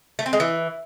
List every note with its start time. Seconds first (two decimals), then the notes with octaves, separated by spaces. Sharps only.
0.19 A3
0.26 C4
0.33 G#3
0.40 E3